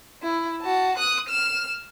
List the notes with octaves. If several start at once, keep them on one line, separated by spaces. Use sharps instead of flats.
E4
F#4 A5
D#6 F#6
F6 E7